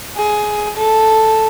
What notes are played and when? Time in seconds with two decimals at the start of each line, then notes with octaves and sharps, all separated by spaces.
0.17 G#4
0.77 A4